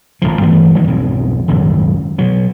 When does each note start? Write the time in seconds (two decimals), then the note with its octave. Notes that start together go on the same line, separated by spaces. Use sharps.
0.22 G#1 C#2 A2 F3
0.41 G2 E3 A3 B3
0.75 D#3 F#3 G3 A#3
0.88 B1 F2 G#2
1.48 D#1 G#1 C#2 F#2
2.18 B2 F#3